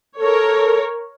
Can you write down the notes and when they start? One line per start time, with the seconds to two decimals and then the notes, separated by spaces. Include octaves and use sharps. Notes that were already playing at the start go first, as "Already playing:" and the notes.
0.19 A4 A#4 C#5